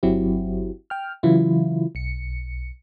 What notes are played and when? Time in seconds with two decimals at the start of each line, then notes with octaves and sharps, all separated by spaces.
0.03 G1 F#3 C4 E4 F#4 G4
0.90 G5 F6
1.23 C#3 E3 F#3 E4 F4
1.95 B1 C#7